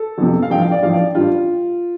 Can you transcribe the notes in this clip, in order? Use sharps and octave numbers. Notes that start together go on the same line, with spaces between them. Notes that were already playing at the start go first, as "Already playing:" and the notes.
Already playing: A4
G1 F2 C3
F5
A1 G2 F3 G5
F5
D5
A1 G2 F3 F5
D5
A1 G2 G3 F4